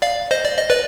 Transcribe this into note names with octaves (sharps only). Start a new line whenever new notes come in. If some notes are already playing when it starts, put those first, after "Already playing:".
D5 F5
C5 D#5
D5
D#5
B4 D5